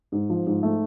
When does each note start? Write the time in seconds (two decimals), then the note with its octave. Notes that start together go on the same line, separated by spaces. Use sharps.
0.12 G#2
0.30 F3
0.47 G#2
0.63 A3